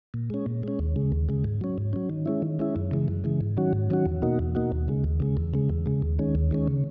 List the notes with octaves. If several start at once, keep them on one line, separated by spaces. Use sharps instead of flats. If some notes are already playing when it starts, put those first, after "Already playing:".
A#2
G#3 C#4
A#2
G#3 C#4
D#2
C#3 G#3
D#2
C#3 G#3
G#2
F#3 C#4
G#2
F#3 C#4
D#3
G#3 C#4 E4
D#3
G#3 C#4 E4
F#2
C#3 E3 G#3
F#2
C#3 E3 G#3
G#2
D#3 F#3 C#4 F#4
G#2
D#3 F#3 C#4 F#4
E2
B2 A#3 D#4 F#4
E2
B2 A#3 D#4 F#4
D#2
C#3 G#3
D#2
C#3 G#3
E2
C#3 G#3
E2
C#3 G#3
D#2
D#3 G#3 C#4
D#2
D#3 G#3 C#4
C#3